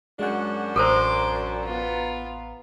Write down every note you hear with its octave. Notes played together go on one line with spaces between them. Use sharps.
F#2 G#3 D4 F#4 F#5
A1 A4 A#4 C5 A#5 C6 D6
B3 F4